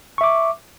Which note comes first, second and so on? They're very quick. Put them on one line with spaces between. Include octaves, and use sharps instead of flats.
C#6 E5 D6